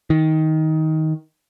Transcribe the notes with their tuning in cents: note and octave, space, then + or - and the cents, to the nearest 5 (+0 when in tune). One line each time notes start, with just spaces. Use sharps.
D#3 +15